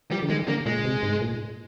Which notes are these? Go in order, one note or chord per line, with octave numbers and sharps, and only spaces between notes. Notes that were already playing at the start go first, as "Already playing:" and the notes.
F3 G3
D3
D#3 G#3
D3 A#3
A#2 G#3
C3
G#2
A#2